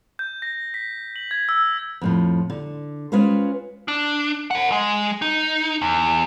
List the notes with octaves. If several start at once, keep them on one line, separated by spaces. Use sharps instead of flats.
G6
A#6
B6
F#7
G#6
E6
F2 A2 F3
D3
G#3 C#4 F4 B4 C5
D4
A#4 F#5
G#3
D#4
E2